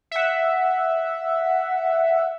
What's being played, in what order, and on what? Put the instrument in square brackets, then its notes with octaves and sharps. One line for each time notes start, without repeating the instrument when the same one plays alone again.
[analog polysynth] E5 F#5